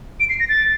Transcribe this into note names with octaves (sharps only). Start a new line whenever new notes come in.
D7
C7
A#6
A6